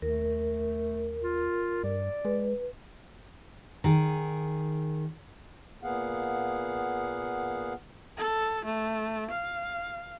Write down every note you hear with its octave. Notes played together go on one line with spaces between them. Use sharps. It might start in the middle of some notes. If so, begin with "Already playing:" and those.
D#2 A3 A#4
F4
G2 D5
G#3 B4
D#3 G#4
A#2 A#3 B3 G#4 F5 F#5
A4
A3
F5